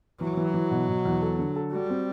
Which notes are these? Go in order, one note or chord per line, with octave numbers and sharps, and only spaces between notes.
E3 F#3
E3
E3
B2
B2
E2
A4
D3
A4
G3 F#4
C4